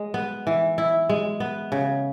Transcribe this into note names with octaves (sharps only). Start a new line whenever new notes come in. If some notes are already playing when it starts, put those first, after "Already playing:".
Already playing: G#3
B3
E3
E4
G#3
B3
C#3